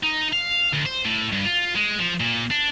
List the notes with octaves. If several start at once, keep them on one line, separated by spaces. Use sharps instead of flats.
D#4
F5
D2
C5
A2
G2
F4
G#3
F3
A#2
D4